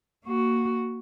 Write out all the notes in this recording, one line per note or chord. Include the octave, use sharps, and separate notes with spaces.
A#3 F#4